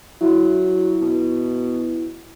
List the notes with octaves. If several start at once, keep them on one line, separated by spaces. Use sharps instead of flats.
F#3 E4
B2